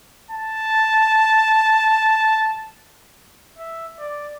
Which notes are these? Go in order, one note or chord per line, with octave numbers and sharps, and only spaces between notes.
A5
E5
D5